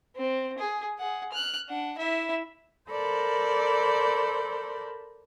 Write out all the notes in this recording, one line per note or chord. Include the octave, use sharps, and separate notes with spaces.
C4
G#4
G#4 F#5
F6 F#6
D4 F#5
E4 E5
A4 A#4 C5 D5 B5